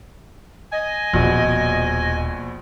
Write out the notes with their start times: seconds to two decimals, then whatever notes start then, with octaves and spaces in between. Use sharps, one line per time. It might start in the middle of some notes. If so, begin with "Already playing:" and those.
0.72 D#5 G#5
1.13 D#1 A#1 B2